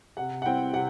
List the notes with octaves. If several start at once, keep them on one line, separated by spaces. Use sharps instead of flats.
C3 F#5
F#5
G3 C4 E4 G5
C3 F#5